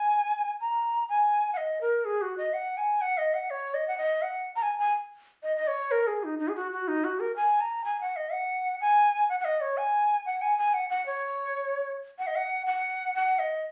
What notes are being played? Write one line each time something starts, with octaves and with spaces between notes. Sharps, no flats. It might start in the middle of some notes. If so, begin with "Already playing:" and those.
Already playing: G#5
A#5
G#5
F#5
D#5
A#4
G#4
F#4
D#5
F#5
G#5
F#5
D#5
F#5
C#5
D#5
F#5
D#5
F#5
A#5
G#5
G#5
D#5
D#5
C#5
A#4
G#4
D#4
D#4
G#4
F#4
F#4
D#4
F#4
A#4
G#5
A#5
G#5
F#5
D#5
F#5
G#5
F#5
F#5
D#5
C#5
G#5
F#5
G#5
G#5
F#5
F#5
C#5
F#5
D#5
F#5
F#5
F#5
D#5